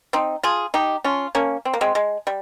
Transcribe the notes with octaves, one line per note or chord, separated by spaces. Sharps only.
C4 D#4
F4 G#4
D#4 G4
C#4 F4
A#3 C#4
C4
A#3
G#3 C4
G#3
G3